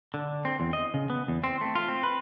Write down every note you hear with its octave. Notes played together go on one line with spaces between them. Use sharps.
D3
C4
E2
D#5
C#3
B3
E2
C4
A3
F4
C4
B4